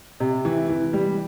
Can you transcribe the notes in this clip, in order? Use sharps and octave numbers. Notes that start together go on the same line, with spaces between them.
C3
E3
E3
G3